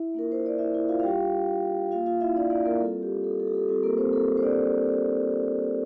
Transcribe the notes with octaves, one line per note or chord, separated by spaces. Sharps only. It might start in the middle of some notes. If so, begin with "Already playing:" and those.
Already playing: E4 E5
A#3 D4 F4 A#4
C5
D5
E4 E5
E4 E5
F4 F5
F5
G3 D4 F4 G4 G5
A#3 F4 F5
F4 F5
E4 E5
D4 D5
D4 D5
A#3 A#4
G3 C4 F4 A4
G4
A4
A4
G4
A4
G4
G3 C4 F4 A4
A#3 A#4
C4 C5
A4
C5
D4 D5